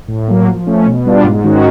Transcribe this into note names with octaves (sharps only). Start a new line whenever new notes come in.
A2
F#3 A#3
F3
A3 C#4
B2
G3 B3 D4 F4
G#2
D#3 G#3 C#4 F#4